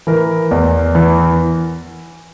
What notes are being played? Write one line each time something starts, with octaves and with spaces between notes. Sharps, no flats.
E3 A#4
E2
E3